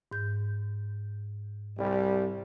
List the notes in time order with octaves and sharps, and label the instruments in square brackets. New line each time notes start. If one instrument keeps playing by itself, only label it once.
[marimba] G#2 G6
[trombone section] C2 G3